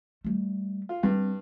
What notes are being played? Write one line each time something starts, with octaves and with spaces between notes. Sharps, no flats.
G3 A3
F4
G2 G3 C4